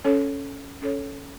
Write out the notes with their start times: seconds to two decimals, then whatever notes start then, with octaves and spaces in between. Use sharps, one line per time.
0.04 C#4 A4 C#5
0.82 C#4 A4 C#5